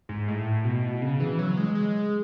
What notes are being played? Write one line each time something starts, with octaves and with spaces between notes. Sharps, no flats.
G#2
A2
B2
C#3
E3
F#3
G#3
G#3